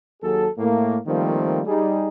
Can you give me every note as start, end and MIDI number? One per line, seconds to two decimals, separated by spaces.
0.22 0.46 39
0.22 0.46 54
0.22 0.46 68
0.22 0.46 69
0.57 0.97 45
0.57 0.97 58
1.06 1.62 51
1.06 1.62 53
1.06 1.62 55
1.06 1.62 57
1.06 1.62 58
1.06 1.62 60
1.66 2.08 55
1.66 2.08 63
1.66 2.08 68